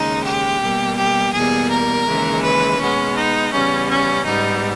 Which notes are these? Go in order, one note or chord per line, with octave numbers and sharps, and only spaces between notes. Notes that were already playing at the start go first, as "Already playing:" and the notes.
Already playing: D#2 C#3 G#3 D#4
G4
B2 G3 A#3
G4
E2 B2 G3 A#3 G#4
A#4
D#2 C#3 E3 G#3
B4
B2 G#3 B3 C#4
D#4
E2 C#3 G3 B3 C#4
C#4
G#2 G3 B3 D#4